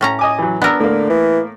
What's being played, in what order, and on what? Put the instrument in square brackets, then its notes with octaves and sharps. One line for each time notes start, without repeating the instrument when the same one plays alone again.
[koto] A2 C#4 A#5
[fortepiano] D#5 G#5 D6
E3 F#3
[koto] B3 A#4 [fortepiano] D4 E6
[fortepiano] A2 A#3 [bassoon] D3
[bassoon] E3